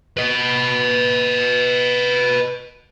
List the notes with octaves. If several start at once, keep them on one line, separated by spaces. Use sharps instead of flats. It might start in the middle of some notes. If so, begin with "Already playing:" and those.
B4 D#5